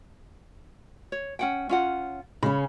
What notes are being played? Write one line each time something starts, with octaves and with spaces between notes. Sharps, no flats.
C#5
C#4 F#5 G5
C#4 F4 F#5
C#3 C#4 B5